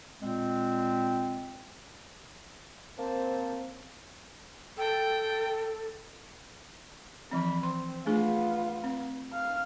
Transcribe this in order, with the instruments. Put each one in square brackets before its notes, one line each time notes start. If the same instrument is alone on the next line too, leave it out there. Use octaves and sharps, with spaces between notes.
[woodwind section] A#2 G#3 C4
[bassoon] A#3 [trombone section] C4 [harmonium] C5 A5
[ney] A4 [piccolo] G5
[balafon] E3 F3 C4 [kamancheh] B5
[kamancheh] C4 [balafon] C6
[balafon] A3 D4 G#4 [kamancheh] B3 F4
[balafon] C4
[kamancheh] F5 F6